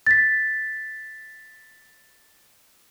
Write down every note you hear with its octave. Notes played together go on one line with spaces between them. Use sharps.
A6 B6